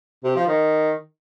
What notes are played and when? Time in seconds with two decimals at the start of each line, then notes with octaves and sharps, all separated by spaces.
0.24 C3
0.36 F3
0.47 D#3